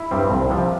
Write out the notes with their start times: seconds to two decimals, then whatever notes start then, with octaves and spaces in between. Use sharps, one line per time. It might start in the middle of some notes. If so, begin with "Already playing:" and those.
Already playing: E4
0.11 G2 G3 C4
0.30 C2
0.50 C3 F3